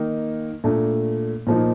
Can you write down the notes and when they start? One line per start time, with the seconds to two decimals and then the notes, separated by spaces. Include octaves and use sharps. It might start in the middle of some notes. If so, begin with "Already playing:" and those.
Already playing: D#3 A#3 D#4
0.64 A#2 A3 D4
1.47 A#2 F3 A#3 D#4